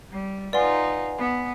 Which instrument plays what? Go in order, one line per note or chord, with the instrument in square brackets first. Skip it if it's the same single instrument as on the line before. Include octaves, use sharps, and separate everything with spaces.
[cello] G3
[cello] D#4 F4 [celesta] B4 F#5 G#5 [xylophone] D5 C6
[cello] B3